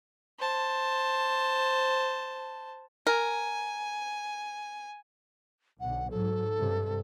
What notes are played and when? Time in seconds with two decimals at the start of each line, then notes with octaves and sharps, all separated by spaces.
0.38 C5 A5
3.07 A#4 G#5
5.80 B1 D3 F#5
6.10 G#2 F#3 A4
6.58 G2 C3